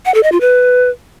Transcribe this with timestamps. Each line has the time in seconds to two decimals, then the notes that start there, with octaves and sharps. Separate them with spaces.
0.05 F#5
0.14 A4
0.23 D#5
0.32 F4
0.41 B4